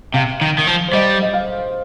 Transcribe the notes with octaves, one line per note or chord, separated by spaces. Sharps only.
C3 F5
D#3
D#3
F3
C5
G3 D#5
D#5
F5